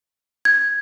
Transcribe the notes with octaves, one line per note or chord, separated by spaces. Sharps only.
G#6